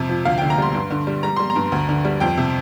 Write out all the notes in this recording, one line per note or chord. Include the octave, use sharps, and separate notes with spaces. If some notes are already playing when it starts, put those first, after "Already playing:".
Already playing: F2 C3
F3
D2 F5
D3 G5
A#5
G3 C6
G2
D3
G3
G3 A#5
G3 C6
A#5
G2
D2
D3
G3
F2 G5
C3